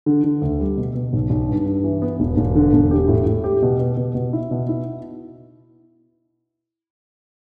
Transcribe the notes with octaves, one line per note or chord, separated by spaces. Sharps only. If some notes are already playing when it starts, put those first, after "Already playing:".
D3
D3
D2
G3
B2
B2
B1
B1
G2
G2
E3
B3
E1
E1
D3
E1
G4
A2
A2
G4
B2
B2
B2
B2
E4
B2
E4